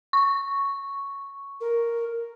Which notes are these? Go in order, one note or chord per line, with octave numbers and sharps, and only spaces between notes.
C#6
A#4